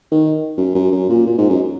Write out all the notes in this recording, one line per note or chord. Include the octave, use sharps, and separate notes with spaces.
D#3
F#2
F#2
F#2
A#2
A#2
G#2
F#2